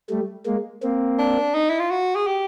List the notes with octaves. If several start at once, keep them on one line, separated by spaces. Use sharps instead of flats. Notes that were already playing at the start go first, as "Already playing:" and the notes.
G3 A3
G#3 A#3
A#3 C4
D4
D#4
E4
F4
F#4
G#4
G4